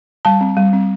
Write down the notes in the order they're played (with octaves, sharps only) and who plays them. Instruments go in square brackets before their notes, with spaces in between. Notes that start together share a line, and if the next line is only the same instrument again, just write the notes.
[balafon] G3 A5
C4
G3
C4